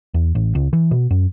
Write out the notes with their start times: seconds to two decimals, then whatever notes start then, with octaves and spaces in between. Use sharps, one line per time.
0.14 E2
0.35 A1
0.55 C#2
0.73 E3
0.91 B2
1.11 F#2